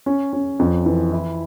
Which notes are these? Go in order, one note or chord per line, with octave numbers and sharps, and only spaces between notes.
C#4
C#4
F2
E3
E4